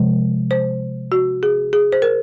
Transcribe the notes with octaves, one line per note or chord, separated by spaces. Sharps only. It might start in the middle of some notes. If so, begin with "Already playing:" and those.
Already playing: C3 F3 G#3
C5
F#4
G#4
G#4
C5
A#4